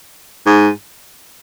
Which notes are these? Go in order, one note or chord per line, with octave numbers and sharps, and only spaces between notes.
G#2